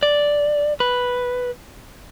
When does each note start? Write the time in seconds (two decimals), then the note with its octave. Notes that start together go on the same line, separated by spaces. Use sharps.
0.03 D5
0.80 B4